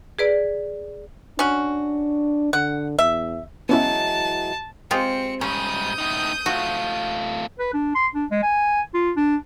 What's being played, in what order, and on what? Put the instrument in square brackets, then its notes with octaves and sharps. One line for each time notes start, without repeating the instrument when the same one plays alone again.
[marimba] G#4 B4 D5
[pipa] C#4 F#4 [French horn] D4
[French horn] D3 [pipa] F#5
[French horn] E2 [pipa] E5
[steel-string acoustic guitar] E3 F#3 G#3 [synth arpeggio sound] B3 C#4 E4 [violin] A5
[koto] G#3 F4 G4 [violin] C4 C#7
[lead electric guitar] G#2 G3 [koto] C#4 [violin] D#6 G6
[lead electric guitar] A2 D#4
[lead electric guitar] A3 F4 [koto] F#4
[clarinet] B4
D4
C6
D4
G#3
G#5
F4
D4